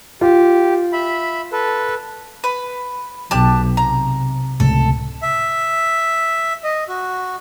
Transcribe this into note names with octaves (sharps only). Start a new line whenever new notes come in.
F4 G4
E5 B5
A4 B4
B4
B1 G4 A5 F#6
C3 A#5
C#2 A2 C3 A4
E5
D#5
F#4